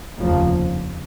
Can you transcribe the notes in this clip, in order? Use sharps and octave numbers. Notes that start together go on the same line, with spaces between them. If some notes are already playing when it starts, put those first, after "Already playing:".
F1 D#2 C#3 F3 A#3